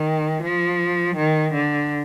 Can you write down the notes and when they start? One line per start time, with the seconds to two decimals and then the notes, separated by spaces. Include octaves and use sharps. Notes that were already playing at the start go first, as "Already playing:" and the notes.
Already playing: D#3
0.43 F3
1.16 D#3
1.53 D3